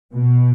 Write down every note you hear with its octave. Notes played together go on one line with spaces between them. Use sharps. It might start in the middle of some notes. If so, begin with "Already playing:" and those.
B2